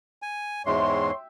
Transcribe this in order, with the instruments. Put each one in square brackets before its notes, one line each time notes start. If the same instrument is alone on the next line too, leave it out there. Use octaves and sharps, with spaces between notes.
[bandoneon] G#5
[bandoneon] E2 G#2 G#3 [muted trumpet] C#5 [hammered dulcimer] E5 G5 [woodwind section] C6